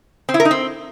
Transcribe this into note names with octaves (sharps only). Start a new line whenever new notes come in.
C4
E4
A#4
D#4
C4